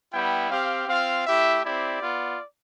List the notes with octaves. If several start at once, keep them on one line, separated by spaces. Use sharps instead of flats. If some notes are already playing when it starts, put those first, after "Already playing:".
G3 B3 E4 G5
C4 G4 F5
C4 F4 F5
A3 E4 G4 E5
C4 E4 G4 D5
B3 F4